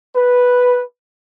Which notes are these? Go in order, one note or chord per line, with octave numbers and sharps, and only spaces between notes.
B4